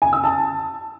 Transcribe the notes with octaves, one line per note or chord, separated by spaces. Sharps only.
G#5
E6
A5